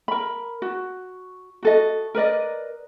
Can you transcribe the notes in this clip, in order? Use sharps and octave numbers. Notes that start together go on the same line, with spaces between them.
A#4 B5
F#4
F#4 A4 D#5
A#4 B4 D5 D#5